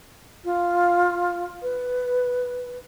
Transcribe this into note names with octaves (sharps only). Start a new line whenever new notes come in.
F4
B4